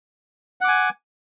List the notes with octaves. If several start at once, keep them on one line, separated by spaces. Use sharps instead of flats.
F#5 G#5 D6